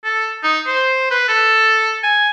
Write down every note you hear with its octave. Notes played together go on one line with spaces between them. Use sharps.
A4
D#4
C5
B4
A4
G#5